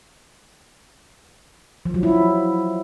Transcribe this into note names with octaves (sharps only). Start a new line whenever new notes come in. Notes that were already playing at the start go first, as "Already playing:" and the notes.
F3
F#3
E4